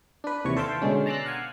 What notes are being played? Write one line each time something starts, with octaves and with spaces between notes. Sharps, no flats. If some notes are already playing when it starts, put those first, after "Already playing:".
D4 B4
D#2 C3 E3 C#5 C#6
A4 C5 E5 F5 G5 A5
B2 D3 G#3 C#4
A5 A#5 C6 D6 E6 F#6
F5 F#5 G#5